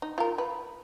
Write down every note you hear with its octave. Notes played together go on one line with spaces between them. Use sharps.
D#4
F4 A#4
B4